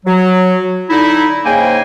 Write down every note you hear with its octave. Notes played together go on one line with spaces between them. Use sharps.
F#3
D3 D#4 E4
G#2 C#3 A#3 C5 G5 G#5